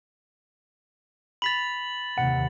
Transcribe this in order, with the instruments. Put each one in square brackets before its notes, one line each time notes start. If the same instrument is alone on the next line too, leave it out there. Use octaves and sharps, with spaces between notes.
[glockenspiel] B5 B6 F7 [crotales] A6 F#7
[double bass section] D#2 C3 [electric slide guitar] F#5